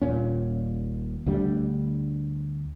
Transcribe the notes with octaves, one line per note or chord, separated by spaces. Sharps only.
D#1 A#1 A#2 C#4
D2 D3 G3